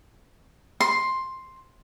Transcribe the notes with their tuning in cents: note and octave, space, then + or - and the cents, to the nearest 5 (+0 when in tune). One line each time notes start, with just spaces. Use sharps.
C6 +5